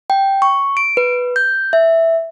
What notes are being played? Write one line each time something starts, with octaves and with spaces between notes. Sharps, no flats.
G5
C#6
D7
B4
G6
E5